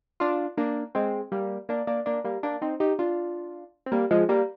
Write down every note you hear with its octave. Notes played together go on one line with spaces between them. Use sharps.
D4 F4
A#3 D4
G#3 C4
G3 A#3
A#3 D4
A#3 D4
A#3 D4
G3 A#3
A#3 D4
C4 D#4
D#4 G4
D4 F4
C4
G3 A#3
F3 G#3
G3 A#3